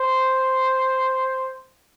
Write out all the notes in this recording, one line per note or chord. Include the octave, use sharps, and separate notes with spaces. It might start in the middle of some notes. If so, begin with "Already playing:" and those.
Already playing: C5